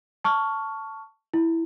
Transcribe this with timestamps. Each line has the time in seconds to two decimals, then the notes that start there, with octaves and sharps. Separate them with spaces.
0.24 A5 C#6 F6
1.34 E4